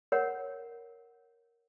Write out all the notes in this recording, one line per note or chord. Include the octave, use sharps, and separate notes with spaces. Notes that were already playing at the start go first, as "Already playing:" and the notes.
A#4 C#5 F#5